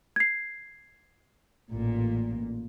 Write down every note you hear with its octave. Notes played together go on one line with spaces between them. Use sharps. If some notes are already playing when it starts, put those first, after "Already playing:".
G#6 C7
A1 A#2